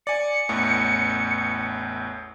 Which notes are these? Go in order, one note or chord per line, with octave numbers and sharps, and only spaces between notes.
D5 G#5 C#7
A1 E2 A2